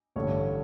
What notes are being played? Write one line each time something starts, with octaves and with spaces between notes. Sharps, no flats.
A1 G2 D3 C#5